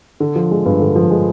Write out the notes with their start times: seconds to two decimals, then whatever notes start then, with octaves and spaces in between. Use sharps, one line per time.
0.20 D3
0.36 F3
0.51 G#3
0.66 G2
0.80 D3
0.96 F3
1.10 G#3